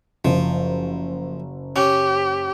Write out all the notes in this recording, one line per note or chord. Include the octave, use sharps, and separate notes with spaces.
F#1 F3
C#4 G4